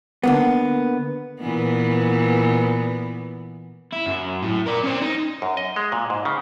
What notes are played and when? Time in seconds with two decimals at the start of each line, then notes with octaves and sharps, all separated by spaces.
0.23 D3 A#3 B3
1.40 A#2 E3 B3
3.92 E4
4.06 F#2
4.42 A2
4.66 A#4 D5
4.83 C#4 C5
5.02 D#4
5.42 F#2
5.57 D#5
5.76 G#3
5.92 A#2
6.10 G#2
6.25 C#3